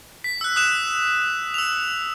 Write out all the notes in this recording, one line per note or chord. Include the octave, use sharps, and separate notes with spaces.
B6
E6 F#6
D#6 F#6 E7
E6 F7